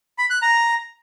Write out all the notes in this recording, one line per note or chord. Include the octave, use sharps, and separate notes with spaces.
B5
F#6
A#5